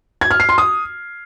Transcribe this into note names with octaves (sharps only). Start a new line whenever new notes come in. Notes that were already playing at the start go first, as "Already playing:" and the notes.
G#6
F6
C7
C6
D#6